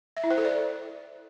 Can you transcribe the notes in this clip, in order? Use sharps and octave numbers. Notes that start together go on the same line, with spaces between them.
E5
E4
C5
A4
D5